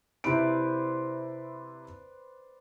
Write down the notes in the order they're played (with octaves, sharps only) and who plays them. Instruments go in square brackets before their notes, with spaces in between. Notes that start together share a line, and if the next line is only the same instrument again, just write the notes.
[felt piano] C3 E4 D7 [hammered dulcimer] B4 C5 D5